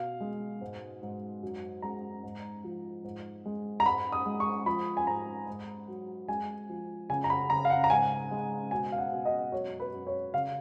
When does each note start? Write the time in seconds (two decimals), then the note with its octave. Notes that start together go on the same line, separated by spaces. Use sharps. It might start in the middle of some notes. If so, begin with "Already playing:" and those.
Already playing: B2 F5
0.20 G#3
0.61 G#2
1.02 G#2
1.43 F#2
1.82 G#3 A#5
2.23 G#2
2.64 F3
3.04 G#2
3.45 G#3
3.80 A#5
3.85 G#2 B5
4.12 D#6
4.26 G#3
4.40 C#6
4.66 F3 B5
4.97 G#5
5.07 G#2 A#5
5.47 G#2
5.88 F#3
6.28 G#3 G#5
6.69 F3
7.10 C#3 G#5
7.24 A#5
7.30 B5
7.50 C#3 A#5
7.65 F5
7.70 F#5
7.84 A#5
7.90 G#2 G#5
8.31 G#3
8.71 B2 G#5
8.92 F5
8.98 F#5
9.12 B2
9.25 D#5
9.52 F#2 C#5
9.80 B4
9.93 F#2
10.07 C#5
10.34 C#3 F5